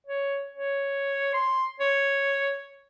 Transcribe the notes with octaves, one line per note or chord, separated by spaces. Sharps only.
C#5
C#5
C6
C#5